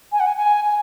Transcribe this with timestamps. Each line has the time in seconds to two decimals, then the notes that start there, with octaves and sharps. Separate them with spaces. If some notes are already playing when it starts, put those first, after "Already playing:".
0.12 G#5
0.20 F#5
0.27 G#5
0.37 G#5
0.65 G#5